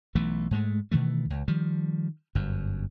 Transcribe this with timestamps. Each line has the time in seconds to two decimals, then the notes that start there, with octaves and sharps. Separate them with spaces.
0.15 B1 E3 A3
0.51 G#2 G#3 A3
0.91 B2 D#3 E3 A3
1.30 C#2
1.48 D#3 F3 G3
2.35 G1 F#2